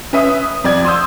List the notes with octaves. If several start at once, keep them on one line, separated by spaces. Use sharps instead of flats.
C#4 B4 E5 D#6
F2 D5 G#6
C6 D#6 E6 G6